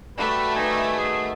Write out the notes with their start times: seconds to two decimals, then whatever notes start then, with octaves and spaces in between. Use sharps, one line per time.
0.18 G3 A3 F#4 B4 D5
0.56 D#3 D#4 B4 G#5 D6
0.97 G#4